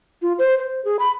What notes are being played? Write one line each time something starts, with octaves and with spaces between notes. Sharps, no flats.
F4
C5
C5
G#4
B5